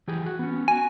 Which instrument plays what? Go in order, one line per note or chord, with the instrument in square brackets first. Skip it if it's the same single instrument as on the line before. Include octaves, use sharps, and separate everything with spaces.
[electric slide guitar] E3 G4 G#4
F#4
B3 C#4
[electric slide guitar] F#4 [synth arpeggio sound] G#5